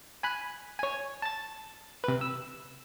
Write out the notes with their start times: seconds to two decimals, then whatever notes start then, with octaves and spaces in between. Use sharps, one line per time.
0.23 G#5 B5 F#6
0.79 C#5 G#5
1.22 A5 A6
2.04 C3 B4
2.21 E6